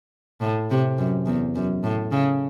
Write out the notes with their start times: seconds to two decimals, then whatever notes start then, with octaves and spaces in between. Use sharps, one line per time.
0.41 A2
0.70 C3
0.98 F#2
1.27 E2
1.55 F#2
1.84 A2
2.12 C#3